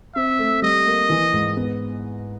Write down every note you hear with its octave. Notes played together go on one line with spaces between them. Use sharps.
C4 E5
A3
G3 D#5
A#3
E3
G#2
B3